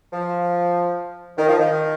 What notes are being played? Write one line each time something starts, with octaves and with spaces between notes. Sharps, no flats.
F3
D#3
F3
D#3